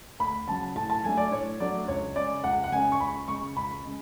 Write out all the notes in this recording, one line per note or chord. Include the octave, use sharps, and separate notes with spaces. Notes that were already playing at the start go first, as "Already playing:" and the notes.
D2 B5
C#3 F#3 A5
A2 A5
A5
F#3 A3 D4 G#5
D5
A2 C#5
F#3 A3 D4 D5
C#2 C#5
C#3 G#3 C#4 D5
C#2 F#5
F#5
C#3 G#3 C#4 G#5
C#6
C#2 B5
C#3 G#3 C#6
C#2 B5
C#3 G#3